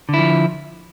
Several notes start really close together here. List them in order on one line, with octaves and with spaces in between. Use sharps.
D3 E4 F3